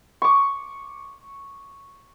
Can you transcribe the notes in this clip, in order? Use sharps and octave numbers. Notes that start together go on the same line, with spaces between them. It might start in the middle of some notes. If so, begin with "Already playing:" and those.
C#6 D6